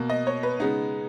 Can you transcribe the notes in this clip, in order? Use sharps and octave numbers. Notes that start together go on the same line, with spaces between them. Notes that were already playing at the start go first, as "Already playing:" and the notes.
Already playing: B2 A#3
D#5
C#5
B4
C#3 G#3 B3 D#4